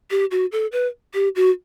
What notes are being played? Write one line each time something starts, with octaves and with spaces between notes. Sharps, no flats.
G4
F#4
A4
B4
G4
F#4